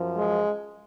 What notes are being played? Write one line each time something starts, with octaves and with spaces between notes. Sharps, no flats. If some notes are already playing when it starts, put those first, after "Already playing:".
Already playing: F#2 F3
G#3